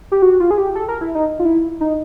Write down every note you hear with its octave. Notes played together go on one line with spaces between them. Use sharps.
G4
F#4
F4
G#4
G4
A4
A#4
E4
D#4
F4
E4
D#4